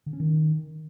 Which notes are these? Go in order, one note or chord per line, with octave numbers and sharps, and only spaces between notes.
D3
C#4
D#3